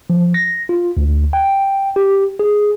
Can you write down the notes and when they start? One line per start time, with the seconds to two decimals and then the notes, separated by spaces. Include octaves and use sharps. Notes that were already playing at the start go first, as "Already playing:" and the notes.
0.10 F3
0.34 A#6
0.69 F4
0.97 D2
1.33 G5
1.96 G4
2.39 G#4